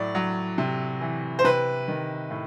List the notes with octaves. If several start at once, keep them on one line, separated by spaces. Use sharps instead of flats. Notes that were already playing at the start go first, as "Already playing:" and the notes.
Already playing: A2 F#3 D5
F#3
C3
E3
C5
C3 B4
D#3
A2